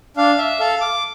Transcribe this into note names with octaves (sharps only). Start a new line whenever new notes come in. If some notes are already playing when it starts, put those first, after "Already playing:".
D4 F5
E5
A4 F5
D6